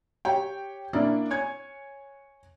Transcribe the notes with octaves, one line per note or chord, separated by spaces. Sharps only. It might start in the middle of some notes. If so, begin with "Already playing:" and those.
G4 C#5 G5
A#3 C#4 D4 E4
C#5 G#5 G#6